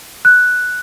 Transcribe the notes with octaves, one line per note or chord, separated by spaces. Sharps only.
F#6